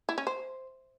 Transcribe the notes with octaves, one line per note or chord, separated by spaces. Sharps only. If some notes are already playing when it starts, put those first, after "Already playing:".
E4
C#4
C5